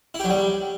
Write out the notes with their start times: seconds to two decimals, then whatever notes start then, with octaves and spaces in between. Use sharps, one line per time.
0.14 E4
0.19 G4
0.24 F#3
0.29 G3